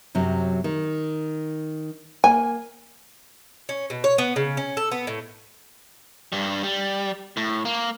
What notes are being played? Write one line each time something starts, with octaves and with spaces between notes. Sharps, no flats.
F#2 C3 F#3
D#3
A#3 G#5
C#4
B2
C#5
B3
C#3
C#4
A4
B3
A2
G2 G3
G3
A2
A#3